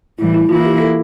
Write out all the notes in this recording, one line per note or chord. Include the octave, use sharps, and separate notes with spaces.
A2 E3 G3 E4
E4
E3 A#3 E4 F4
G4
A4